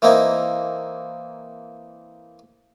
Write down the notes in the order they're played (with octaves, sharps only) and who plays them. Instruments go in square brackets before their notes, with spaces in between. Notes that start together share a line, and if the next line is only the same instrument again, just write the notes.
[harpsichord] E3 A#3 C4 D#4 E4